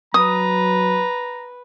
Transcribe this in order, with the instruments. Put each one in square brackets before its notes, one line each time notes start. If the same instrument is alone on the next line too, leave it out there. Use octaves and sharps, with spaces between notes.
[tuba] F#3 [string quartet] B4 [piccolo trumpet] A#5 [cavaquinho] D#6